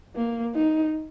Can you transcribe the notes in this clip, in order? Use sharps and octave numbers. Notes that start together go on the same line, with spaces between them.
A#3
D#4